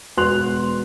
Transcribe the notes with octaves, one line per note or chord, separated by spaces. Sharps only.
E1 B3 F#4 C6 F#6 F7